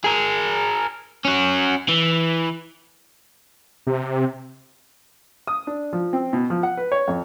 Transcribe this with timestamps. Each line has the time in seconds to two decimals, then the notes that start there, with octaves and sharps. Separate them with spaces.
0.04 G#4 A#4
1.25 C#4 F#4
1.88 E3
3.87 C3
5.47 D#6
5.67 D4
5.93 F3
6.13 C4
6.33 B2
6.50 F3
6.63 F#5
6.77 B4
6.92 C#5
7.08 F2